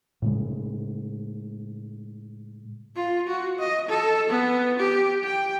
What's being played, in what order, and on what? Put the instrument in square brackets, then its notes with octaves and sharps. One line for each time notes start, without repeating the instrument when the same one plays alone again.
[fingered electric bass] A2 C#3 G#3
[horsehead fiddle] F4
F#4
D#5
A4
B3
G4
G5